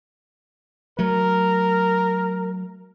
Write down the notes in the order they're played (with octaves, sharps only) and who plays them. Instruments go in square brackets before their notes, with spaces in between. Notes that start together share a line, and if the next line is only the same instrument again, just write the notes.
[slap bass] F#3 A3 [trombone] A#4